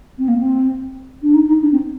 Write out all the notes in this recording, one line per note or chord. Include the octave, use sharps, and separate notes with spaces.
C4
A#3
C4
D4
D#4
D#4
D4
C4